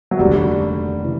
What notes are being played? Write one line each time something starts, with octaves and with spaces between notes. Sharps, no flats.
F#3
F1 D#2 D3 G3
C#3 E3